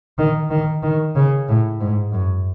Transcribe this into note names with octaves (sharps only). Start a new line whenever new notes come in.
D#3
D#3
D#3
C#3
A2
G#2
F#2